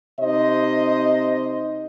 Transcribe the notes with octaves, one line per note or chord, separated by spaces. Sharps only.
C3 D#4 C5 D#5